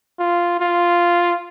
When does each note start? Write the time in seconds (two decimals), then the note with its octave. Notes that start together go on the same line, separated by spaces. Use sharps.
0.19 F4
0.60 F4